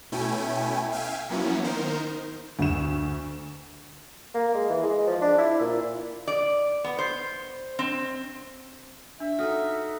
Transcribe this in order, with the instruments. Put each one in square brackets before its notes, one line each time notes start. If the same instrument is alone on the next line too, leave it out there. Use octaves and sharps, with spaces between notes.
[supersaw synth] B2 A3 C#4 E4 G5 G#5
E5 F5 G5 G#5
F3 F#3 A#3 B3 C#4 E4
D#3 D#4 A#4 C5
[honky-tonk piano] D2 E7
[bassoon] A#3
G#3
E3
G#3
F3
D4
E4
A#2
[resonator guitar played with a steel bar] D5
B3
C5
C4
[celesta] D4 [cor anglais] E5
[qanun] D#4 F#4 [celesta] A4 D#6 F6